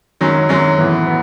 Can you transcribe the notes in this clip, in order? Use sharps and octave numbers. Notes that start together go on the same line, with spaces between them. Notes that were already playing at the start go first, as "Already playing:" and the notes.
F#2 D#3 F#3 G#3 C#4
F#2 D#3 F#3 G#3 C#4
A2 E3 B3
B3